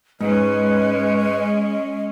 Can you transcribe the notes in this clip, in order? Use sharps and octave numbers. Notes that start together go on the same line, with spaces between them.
G#2 G#3 C#4 B4 D#5